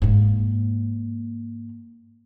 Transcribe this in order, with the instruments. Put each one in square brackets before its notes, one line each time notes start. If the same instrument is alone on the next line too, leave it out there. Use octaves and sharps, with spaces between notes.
[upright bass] G#2 A#3